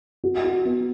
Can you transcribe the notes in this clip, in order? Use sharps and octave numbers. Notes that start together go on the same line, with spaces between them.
F#4
F#4
B3